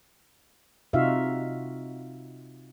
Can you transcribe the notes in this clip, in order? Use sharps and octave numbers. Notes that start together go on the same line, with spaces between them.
C3 D#4 F4 F#4 E5 F5